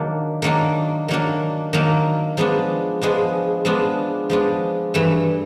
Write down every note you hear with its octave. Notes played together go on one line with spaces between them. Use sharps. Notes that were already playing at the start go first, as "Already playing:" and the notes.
Already playing: D#3 F#3 A#3 D4
D#3 F#3 A#3 D4
D#3 F#3 A#3 D4
D#3 F#3 A#3 D4
F3 G#3 B3 D4
F3 G#3 B3 D4
F3 G#3 B3 D4
F3 G#3 B3 D4
G2 E3 A3